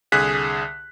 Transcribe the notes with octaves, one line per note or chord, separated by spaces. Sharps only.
C2 D3 G#4 F#6 B6